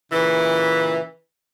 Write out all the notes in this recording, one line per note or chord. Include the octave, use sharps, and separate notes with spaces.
A#2 C#3 E3